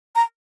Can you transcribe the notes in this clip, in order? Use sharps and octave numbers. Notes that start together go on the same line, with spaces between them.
A#5